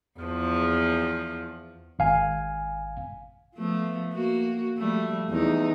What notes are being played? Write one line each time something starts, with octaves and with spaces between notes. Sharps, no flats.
E2 F3
G#1 F5 G#5
F3 A3 B3
A#3 F#4
F3 G3 A3
E2 D#4